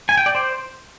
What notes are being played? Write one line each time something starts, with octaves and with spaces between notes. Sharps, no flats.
G#5
G5
D5
C5